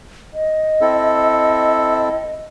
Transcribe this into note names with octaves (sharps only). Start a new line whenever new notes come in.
D#5
C4 E4 A4